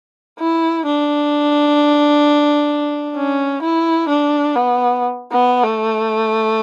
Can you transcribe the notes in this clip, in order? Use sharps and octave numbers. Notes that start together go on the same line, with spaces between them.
E4
D4
C#4
E4
D4
B3
B3
A3